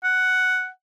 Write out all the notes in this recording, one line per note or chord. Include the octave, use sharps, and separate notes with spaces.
F#5